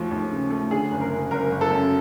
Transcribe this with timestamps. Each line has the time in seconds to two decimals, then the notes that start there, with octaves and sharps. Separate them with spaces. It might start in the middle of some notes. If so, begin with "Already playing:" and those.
Already playing: D#2 F3 A3
0.11 D#2
0.31 C#3
0.51 A3
0.71 D3 G#4
0.91 F#1
1.01 A#4
1.12 F#1
1.31 F#1 A#4
1.52 F#1
1.61 A4
1.71 F#2